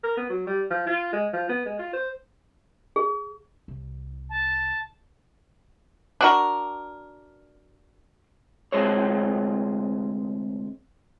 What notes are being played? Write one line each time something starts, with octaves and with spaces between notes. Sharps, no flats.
A#4
B3
F#3
G3
F3
F4
G#3
F3
B3
G#3
F4
C5
G#4
C2
A5
D4 F#4 A#4
D2 C3 G#3 C5 C#5